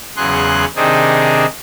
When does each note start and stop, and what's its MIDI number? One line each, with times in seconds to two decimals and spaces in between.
0.16 0.65 40
0.16 0.65 49
0.16 0.65 54
0.16 0.65 68
0.16 0.65 84
0.16 0.65 90
0.76 1.46 48
0.76 1.46 51
0.76 1.46 60
0.76 1.46 62
0.76 1.46 63
0.76 1.46 68